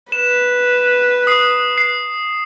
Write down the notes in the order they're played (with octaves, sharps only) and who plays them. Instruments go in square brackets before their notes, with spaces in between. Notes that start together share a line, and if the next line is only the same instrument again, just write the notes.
[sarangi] B4 [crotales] E7
[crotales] D#6 C7
C7